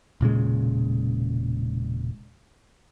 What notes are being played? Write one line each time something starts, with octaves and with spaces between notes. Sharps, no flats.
E1 A#2 C#3 G#3